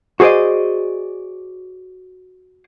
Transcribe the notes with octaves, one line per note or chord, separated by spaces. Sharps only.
F#4 G#4 C5 D5 D#5